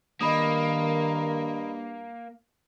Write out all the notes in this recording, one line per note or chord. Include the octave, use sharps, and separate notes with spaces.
G2 D#3 A#3 D#5 B5 D#6